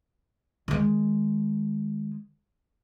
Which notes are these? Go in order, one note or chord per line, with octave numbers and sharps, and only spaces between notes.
D#3 G#3